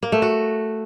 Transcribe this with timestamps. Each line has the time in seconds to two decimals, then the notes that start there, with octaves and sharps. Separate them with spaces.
0.03 A#3
0.12 A3
0.22 F#4